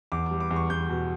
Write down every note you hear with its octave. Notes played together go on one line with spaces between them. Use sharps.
E2 D6
G3 D6
D6
E2
C#6
E2 G6
B2